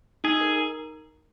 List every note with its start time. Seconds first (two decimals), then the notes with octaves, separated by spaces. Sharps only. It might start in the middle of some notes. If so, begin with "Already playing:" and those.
0.24 D#4 G#4
0.41 A#4